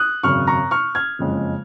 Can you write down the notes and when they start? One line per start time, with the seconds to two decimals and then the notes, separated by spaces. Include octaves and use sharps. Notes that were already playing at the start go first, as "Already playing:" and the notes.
Already playing: D#6 F#6
0.23 G#1 F#2 C#3 C#6 F6
0.47 A#5 C#6
0.71 C#6 F6
0.95 F6 G#6
1.19 F#1 F2 C#3 G#3